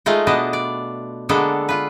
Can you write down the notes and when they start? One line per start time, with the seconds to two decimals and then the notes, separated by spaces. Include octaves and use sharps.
0.06 G#3 A3 D#4 F4
0.27 B2 B3 D4 D#5 A5
0.53 D5
1.29 D3 G#3 A#3 B3 D4 A4
1.69 F4 B4